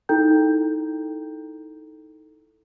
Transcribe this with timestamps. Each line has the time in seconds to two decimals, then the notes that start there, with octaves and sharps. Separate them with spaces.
0.09 D#4 E4 A4 G5 A#5 G6